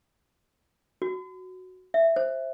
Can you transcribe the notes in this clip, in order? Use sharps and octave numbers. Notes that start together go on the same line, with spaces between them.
F#4
E5
C5